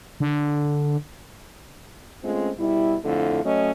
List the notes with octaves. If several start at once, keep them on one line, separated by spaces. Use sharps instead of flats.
D3
G#3 A3 C4 C#4 F4
B2 G3 E4
F2 D3 A3 E4 F4
F#3 A3 C#4 D#5